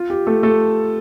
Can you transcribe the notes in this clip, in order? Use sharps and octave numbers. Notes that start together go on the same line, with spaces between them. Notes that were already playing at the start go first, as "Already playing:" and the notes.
Already playing: F4
G4
A3 A4
A3 A4